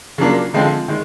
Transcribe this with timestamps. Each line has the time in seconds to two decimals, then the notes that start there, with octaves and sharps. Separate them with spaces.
0.18 C#3 F#3 A#3 D4 F4
0.54 D3 F3 G#3 C4 F4
0.88 D#3 G#3